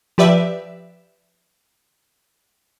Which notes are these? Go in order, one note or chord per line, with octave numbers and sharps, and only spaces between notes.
F3 G4 B4 D5 E5